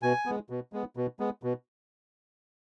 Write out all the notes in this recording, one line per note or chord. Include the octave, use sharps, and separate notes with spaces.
B2 G#5
G#3 B3
B2
G#3 B3
B2
G#3 B3
B2